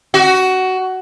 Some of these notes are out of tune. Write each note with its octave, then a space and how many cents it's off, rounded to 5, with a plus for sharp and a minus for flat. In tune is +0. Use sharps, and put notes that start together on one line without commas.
F#4 +15